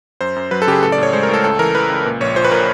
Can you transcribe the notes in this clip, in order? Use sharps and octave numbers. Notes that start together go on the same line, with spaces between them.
F#2 C5
F#2
F#3 B4
A4
C#3 G4 G#4
A2 A4
D5
A2 C#5
G#3 C5
A#4
A2
A4
C#2 A4
E3 A#4
E3 B4
C#2
A#2
A#1 C#5
F3 C5
B4
A#2 A#4